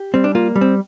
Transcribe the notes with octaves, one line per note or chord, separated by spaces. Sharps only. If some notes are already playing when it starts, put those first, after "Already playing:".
Already playing: G4
G3 C4
D4
A#3 F4
G3
C4